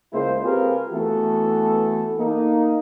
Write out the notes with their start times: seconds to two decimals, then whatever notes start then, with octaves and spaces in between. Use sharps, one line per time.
0.13 C#2 G#3 A#3 E4 C5
0.44 C4 F4 G4 G#4 A#4 B4
0.93 E3 A3 B3 F#4 A4
2.18 A#3 D#4